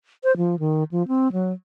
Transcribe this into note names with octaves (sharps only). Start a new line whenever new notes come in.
C5
F3
D#3
F3
C4
F#3